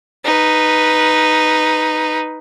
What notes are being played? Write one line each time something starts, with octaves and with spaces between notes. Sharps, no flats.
D#4 B4